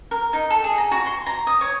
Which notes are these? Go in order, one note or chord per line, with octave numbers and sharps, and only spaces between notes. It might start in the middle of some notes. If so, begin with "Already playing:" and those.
A#4
D#4
A4
G#4
A#5
F#4
C6
A#5
D#6
C#5